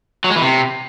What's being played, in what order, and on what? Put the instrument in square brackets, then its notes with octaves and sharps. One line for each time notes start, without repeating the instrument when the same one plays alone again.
[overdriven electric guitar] F#3
G#3
E3
C3